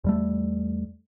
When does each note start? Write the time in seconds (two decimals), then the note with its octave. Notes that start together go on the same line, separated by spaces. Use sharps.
0.04 E2 G3 A3